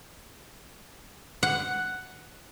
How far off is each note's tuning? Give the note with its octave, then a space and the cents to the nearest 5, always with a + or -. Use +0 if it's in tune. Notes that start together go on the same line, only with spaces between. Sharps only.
F#5 +5